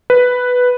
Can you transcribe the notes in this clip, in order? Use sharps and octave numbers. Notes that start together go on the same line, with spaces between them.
B4